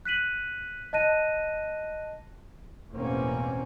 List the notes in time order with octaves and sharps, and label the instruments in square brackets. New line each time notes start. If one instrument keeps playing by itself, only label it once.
[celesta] F#6 B6 D#7 F#7
D#5 A5 F#6 A#6 D#7
[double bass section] A1 E2 B2 A#3 C4 C#4